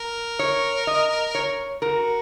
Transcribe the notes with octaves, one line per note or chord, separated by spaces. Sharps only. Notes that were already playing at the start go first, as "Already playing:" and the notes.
Already playing: A#4
C#5
D#5
C#5
F#4 A#4